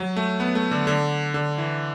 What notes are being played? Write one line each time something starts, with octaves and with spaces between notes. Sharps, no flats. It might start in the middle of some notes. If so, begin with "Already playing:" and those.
Already playing: F#3
A3
B3
A3
D3
D3
D3
E3